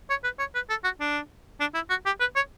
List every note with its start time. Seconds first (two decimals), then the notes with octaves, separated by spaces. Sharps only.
0.10 C#5
0.24 B4
0.39 C#5
0.55 B4
0.70 A4
0.84 F#4
1.00 D4
1.60 D4
1.75 E4
1.90 F#4
2.06 G4
2.20 B4
2.36 C#5